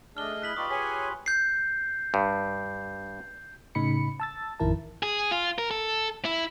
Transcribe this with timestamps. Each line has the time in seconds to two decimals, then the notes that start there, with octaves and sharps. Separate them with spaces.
0.17 A3 D4 G#4 D#5 F6 G7
0.42 E4 F#6 B6 F#7
0.56 D#4 F4 G4 B4 D5 C6 C#6 D#6
0.71 G#4 C#5 G#5 B6
1.26 G6 C7
2.14 G2
3.75 A2 C#3 D#4 B5 C#7
4.20 A5 E6 A6
4.60 A1 F2 D#3 E4 A#4 A5
5.03 G#4
5.31 F4
5.58 A#4
5.71 A4
6.25 E4